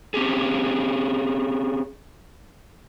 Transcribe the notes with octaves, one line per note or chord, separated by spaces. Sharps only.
C4 C#4 G4 G#4